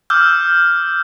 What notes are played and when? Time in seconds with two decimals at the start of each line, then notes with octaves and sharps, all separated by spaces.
0.10 D6 E6 F6 G6